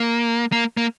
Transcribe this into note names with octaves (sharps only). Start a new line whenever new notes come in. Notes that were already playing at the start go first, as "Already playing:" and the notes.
Already playing: A#3
A#3
A#3